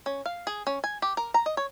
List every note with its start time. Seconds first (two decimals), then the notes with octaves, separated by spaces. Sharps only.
0.06 C#4
0.26 F5
0.47 G#4
0.67 C#4
0.84 G#5
1.02 G4
1.17 A#4
1.34 A#5
1.46 D#5
1.57 C#5